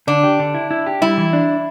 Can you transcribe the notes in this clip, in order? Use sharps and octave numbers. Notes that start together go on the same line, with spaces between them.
D3 D4
G4
D3
E4
E4
G4
G3 E4
E3
D4